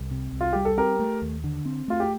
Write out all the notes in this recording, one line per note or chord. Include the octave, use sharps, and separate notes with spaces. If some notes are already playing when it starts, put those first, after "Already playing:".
Already playing: C2
C3
C2
F4
G3 G4
A4
C4 G4 A#4
A3
D#2
D3
C4
A3 F4
G4